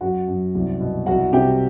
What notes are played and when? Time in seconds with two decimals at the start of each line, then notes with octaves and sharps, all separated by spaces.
0.01 F#2 F#4 F#5
0.28 F#2
0.55 C2
0.80 B2
1.06 C2 F#4 F#5
1.33 C3 G4 G5